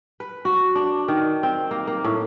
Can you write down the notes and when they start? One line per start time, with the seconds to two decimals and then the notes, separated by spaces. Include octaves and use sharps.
0.20 B4
0.45 F#4
0.75 D4
1.08 D#3
1.43 C4
1.71 A#3
1.87 A#3
2.04 A2